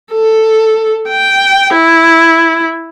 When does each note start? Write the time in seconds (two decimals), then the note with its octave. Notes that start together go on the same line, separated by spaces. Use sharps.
0.13 A4
1.09 G5
1.74 E4